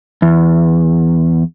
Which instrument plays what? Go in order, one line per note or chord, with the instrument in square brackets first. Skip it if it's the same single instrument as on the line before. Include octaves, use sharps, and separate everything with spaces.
[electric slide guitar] E2